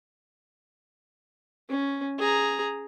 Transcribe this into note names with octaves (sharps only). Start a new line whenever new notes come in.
C#4
G#4 A#5